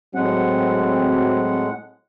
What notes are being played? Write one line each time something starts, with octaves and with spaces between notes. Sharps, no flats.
A2 F#3 G#3 C4 F#5